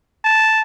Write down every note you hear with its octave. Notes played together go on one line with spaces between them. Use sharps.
A5